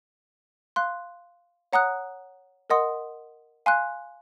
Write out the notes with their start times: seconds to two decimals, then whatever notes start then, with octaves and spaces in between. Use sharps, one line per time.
0.76 F5 C6 F#6
1.73 C#5 F#5 A#5 D#6 F#6
2.70 A#4 D#5 F#5 C6 D#6
3.66 F5 G#5 C6 F#6